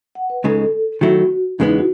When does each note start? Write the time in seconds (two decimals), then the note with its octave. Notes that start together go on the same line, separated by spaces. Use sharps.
0.15 F#5
0.30 B4
0.44 C#2 C#3 G#3 D#4 A4
1.01 D#3 F#3 A3 E4 F#4
1.59 E2 C#3 G#3 B3 D#4
1.69 E4
1.78 F#4